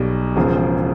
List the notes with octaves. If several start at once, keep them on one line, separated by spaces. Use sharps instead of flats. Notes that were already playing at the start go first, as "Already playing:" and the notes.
Already playing: B1 B2 G3
E1 E2 C#3 F3